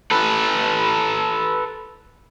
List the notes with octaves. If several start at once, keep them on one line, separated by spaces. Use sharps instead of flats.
A4 B4